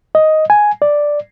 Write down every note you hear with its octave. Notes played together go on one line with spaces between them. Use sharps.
D#5
G#5
D5